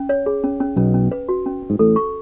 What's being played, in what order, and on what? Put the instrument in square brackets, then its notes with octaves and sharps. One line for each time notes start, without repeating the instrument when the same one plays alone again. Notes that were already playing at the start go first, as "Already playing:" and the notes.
Already playing: [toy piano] C#4
C#5
G#4
C#4
C#4
[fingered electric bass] B1 B2 [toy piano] C#4
[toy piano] C#4
B4
F#4
C#4
C#4
[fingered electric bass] G#2
[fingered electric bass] A1 A2 [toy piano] A4
[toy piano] C#6